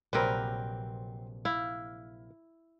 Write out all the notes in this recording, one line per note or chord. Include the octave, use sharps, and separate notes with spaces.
A#1 C3 F#3 G3 C4 A#4 B4
E4 F5